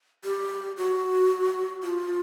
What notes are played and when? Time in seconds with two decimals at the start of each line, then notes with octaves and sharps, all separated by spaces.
0.24 G4
0.77 F#4
1.83 F4